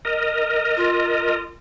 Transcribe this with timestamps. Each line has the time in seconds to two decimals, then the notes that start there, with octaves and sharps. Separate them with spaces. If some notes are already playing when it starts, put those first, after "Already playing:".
0.05 A#4 D#5
0.77 F4